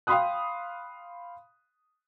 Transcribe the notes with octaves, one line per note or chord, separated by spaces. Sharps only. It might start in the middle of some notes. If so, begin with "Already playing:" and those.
F5 G5 B5 C6 D#6 F#6